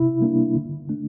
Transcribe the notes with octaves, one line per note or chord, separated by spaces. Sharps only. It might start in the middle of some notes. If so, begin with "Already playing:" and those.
Already playing: C3 E4
G3 A#3 D4
D3
A3 D4